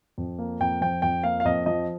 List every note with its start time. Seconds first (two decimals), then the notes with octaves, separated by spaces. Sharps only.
0.18 F2
0.39 A#3
0.60 F2 G5
0.81 F3 G5
1.02 F2 G5
1.23 A#3 F5
1.40 F5
1.45 F2 D#5
1.66 F3 D#5